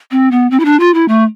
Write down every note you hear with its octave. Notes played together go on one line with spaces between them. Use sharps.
C4
B3
C4
E4
D4
F4
E4
A3